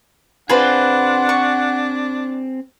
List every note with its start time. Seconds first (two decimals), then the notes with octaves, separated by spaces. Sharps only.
0.49 C4 D4 F4 G#4 B4 C5 F#5
1.29 C#6